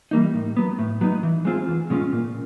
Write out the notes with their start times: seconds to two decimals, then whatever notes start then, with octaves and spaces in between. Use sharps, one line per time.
0.11 E3 G3 A#3 D#4
0.34 A2
0.57 F#3 B3
0.79 A2
1.01 F#3 B3 D#4
1.23 E3
1.45 G#3 C4 F4 G#4
1.68 E2
1.90 B2 G#3 C#4 F4
2.13 A#2